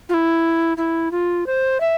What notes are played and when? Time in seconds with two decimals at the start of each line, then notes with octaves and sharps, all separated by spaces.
0.09 F4
0.14 E4
0.77 E4
1.11 F4
1.46 C5
1.80 E5